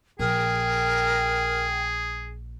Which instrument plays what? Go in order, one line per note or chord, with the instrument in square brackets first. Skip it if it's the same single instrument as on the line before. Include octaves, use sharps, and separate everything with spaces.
[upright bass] A#1 [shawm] G#4 [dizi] A#4 [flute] G5